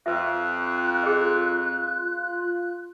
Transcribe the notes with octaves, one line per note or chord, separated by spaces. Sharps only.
F2 F4 B4 E5 F#6
G#4 D#5